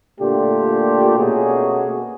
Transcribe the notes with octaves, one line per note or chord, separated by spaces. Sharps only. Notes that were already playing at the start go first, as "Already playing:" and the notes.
A#2 D3 A3 F4 G4
B2 A3 A#3 C#4 F#4 G#4